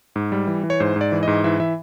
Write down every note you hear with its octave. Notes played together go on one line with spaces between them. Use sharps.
G#2
G3
E3
E3
C#5
G#2 C5
G#2
D5
E3
G#2 D#5
E3 E5
E3 E5